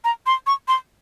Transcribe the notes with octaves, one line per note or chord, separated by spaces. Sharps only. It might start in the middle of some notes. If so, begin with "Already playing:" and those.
A#5
C6
C#6
C6